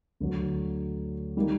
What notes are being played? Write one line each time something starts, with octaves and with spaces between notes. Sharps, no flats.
D2 D3 F#3
D#3 G3 A#3 D#4